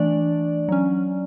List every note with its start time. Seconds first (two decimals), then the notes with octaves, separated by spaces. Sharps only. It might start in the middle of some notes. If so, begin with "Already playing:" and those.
Already playing: E3 A3 D4 D5
0.69 F#3 C#4